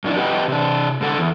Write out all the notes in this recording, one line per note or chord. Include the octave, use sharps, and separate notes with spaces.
F#2 D4 E4
G4 B4 D#5 F#5 G5
C3 D4
G#2 D3 A4 F#5
E2